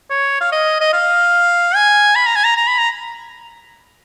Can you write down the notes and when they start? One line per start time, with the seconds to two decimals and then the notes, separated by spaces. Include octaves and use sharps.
0.10 C#5
0.41 F5
0.52 D#5
0.81 D#5
0.93 F5
1.76 G#5
2.16 B5
2.26 A#5
2.35 G#5
2.44 A#5
2.57 A#5
2.67 B5
2.78 A#5